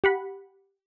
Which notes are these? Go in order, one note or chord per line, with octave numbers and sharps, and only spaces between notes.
G4 F#5 B5